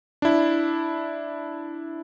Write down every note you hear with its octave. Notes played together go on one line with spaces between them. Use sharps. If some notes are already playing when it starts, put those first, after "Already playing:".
D4 E4